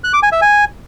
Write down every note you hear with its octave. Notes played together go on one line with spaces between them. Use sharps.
F#6
D6
G#5
E5
G#5